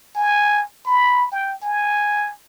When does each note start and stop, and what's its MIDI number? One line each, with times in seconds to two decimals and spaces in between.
0.15 0.62 80
0.86 1.31 83
1.32 1.54 79
1.63 2.31 80